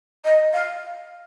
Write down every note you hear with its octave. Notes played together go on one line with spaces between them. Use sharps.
D#5
F5